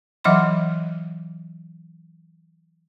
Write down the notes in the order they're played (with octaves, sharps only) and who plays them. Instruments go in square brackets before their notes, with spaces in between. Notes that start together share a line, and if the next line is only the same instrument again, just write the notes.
[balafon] E3 F#3 D#5 F#5 B5 C6